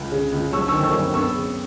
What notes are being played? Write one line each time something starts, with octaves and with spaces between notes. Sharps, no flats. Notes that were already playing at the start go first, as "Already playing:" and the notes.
Already playing: C#2
C#3
C#2
F#3 C#6 E6
C#6 E6
D#3
C#6 E6
F#3
B3 C#6 E6
C#3